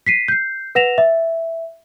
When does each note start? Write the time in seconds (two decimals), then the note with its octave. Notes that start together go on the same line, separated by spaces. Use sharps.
0.07 B6 C7 D#7
0.28 G6 C7
0.75 B4 F#5 A#6 E7 F7
0.98 E5